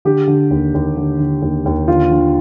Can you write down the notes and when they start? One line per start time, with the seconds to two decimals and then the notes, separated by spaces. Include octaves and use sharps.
0.05 D3 G4
0.28 D3
0.51 D#2
0.74 D#2
0.97 D3
1.19 D3
1.42 D#2
1.66 D#2
1.88 D3 F4
2.11 D3